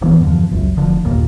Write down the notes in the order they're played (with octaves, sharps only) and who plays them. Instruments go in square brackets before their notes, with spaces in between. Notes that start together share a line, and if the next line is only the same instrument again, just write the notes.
[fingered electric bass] D1 E3 B3
E2 G2 D3 F3
G1 C#2 F#2
F1 D3 F3
G1 D#2 A#2